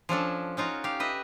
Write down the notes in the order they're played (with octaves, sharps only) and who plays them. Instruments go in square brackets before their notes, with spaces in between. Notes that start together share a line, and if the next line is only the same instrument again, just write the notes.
[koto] F3 C#4 D4 A4
C#4 D#4 F4 F#4
G4 F5
B4 D#5 E5